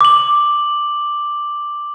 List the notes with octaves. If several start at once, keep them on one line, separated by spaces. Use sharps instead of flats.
D6 F#7